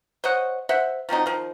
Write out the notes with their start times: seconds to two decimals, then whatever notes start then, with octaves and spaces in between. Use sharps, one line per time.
0.24 C5 C#5 D#5 F#5
0.69 C5 E5 F#5
1.09 F3 F#3 C4 D#4
1.26 D#3 F3